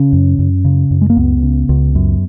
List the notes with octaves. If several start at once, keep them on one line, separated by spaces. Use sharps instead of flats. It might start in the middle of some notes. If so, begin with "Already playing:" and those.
Already playing: C#3 C#4
F#2
F#2
C#3
F#2
G#3
A#3
C#2 B3
C#3
C#2
F#2